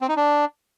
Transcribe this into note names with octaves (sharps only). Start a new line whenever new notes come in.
C4
D#4
D4